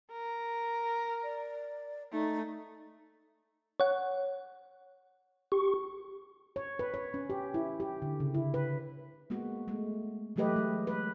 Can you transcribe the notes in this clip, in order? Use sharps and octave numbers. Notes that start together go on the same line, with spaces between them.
A#4
D5
A3 D#4
C#5 F#5
G4 C#6
C#5
B4
C#5
C#4
G4
E4
G4
D3
C#3
E4
B4
G#3 A#3 B3 F#4
G#3 A3
E3 F#3 A3 G4 B4 D#5
G#3
B4